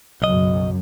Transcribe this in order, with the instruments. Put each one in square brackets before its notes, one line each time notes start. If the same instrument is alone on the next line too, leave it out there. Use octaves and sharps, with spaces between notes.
[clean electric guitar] B1 D#5 [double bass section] F#2 C#3 F#3